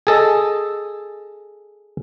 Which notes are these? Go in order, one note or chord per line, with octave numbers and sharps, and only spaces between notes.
G#4 A4 D#5